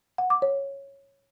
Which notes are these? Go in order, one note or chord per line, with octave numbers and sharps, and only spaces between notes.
F#5
D6
C#5